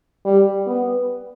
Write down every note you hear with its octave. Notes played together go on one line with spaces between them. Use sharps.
G3
B3